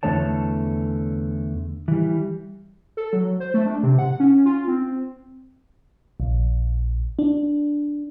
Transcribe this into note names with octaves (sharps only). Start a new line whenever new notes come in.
E2 D3 A3 C#5 A5
E3 G3
A4
F#3
C5
A3
D4
C3
F#5
C#4
F4
C4
A#1
D4